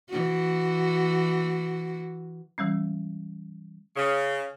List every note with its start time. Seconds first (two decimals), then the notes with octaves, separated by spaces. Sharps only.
0.10 E3 F#4
2.58 E3 G3 G#3 C#4
3.96 C#3